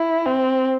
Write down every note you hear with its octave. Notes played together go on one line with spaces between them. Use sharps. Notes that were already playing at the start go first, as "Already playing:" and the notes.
Already playing: E4
C4